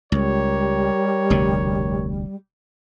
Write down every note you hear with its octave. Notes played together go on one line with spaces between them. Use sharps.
C#2 G3 G4 A#4 C#5
F1 D2 B2